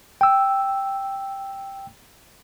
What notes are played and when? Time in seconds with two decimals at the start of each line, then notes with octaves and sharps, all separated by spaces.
0.21 G5 E6